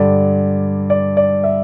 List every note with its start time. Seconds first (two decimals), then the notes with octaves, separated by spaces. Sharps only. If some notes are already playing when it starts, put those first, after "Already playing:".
Already playing: G2 D3 D5
0.90 D5
1.17 D5
1.44 E5